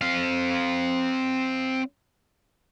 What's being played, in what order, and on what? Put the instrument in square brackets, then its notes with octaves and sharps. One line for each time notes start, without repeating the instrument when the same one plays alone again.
[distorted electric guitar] C4 F5